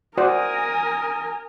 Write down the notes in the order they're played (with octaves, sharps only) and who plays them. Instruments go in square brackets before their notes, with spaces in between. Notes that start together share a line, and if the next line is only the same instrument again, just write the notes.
[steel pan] F#4 C5 D5 [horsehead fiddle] A#4 G#5 [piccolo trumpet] D#6